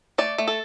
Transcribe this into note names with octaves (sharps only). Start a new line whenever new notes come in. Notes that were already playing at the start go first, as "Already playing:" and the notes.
A3 D5
A3
A4